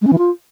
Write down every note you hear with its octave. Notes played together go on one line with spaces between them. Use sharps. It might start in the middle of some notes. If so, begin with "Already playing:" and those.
G#3
C#4
E3
F4